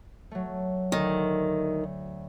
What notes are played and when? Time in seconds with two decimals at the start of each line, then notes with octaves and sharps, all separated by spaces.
0.31 F#3 A3
0.92 D2 D#3